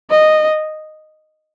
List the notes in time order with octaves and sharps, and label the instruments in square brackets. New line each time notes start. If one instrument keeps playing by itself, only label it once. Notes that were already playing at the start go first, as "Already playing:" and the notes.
[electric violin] D#5